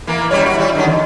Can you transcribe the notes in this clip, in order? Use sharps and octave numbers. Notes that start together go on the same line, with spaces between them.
E3 A#3
F#2 G3 C#5
F#4
G3 E4
D3 D#3 C#4
E2